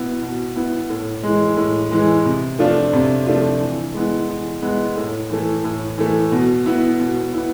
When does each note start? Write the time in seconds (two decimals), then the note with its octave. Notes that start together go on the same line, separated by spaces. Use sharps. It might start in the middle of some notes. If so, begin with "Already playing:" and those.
Already playing: B2 B3 E4
0.22 B2
0.56 B3 E4
0.90 A2
1.23 E3 G#3
1.57 A2
1.91 E3 G#3
2.25 C3
2.59 F3 A3 D4 F4
2.93 C3
3.27 F3 A3 D4 F4
3.60 E3
3.94 G#3 B3 E4
4.29 E3
4.62 G#3 B3 E4
4.97 A2
5.30 E3 A3
5.64 A2
5.98 E3 A3
6.32 B2
6.66 B3 E4
6.99 B2
7.34 B3 E4